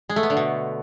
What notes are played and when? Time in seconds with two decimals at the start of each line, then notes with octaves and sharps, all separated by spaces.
0.09 G#3
0.16 A3
0.23 B3
0.30 D3
0.37 B2